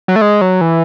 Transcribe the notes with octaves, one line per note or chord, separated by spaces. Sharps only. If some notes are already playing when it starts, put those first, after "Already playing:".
F#3
A3
G#3
F#3
E3